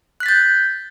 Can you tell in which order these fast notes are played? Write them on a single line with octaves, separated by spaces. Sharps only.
F#6 B6 A6 G6